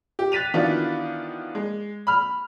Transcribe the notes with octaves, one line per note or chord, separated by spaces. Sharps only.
G4
F#6 A6 B6 D#7 F7
D#3 E3 B3 D4 F4 F#4
G#3
B5 F6